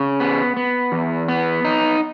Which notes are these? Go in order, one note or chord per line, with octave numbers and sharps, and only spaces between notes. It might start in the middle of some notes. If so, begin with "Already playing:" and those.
Already playing: C#3
B3
B3
E2
B3
D#4